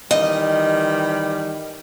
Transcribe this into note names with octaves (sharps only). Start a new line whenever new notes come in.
D#3 E3 G3 D#5